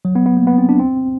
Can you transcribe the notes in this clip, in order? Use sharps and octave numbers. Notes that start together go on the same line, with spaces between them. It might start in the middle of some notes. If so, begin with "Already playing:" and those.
F#3
B3
B3
A#3
B3
C4
D4
C4